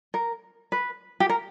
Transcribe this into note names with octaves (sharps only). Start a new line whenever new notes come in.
A#4
B4
G4
A#4